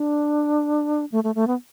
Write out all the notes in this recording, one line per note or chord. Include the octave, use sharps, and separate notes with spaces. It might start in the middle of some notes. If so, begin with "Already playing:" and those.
Already playing: D4
A3
A3
A3
B3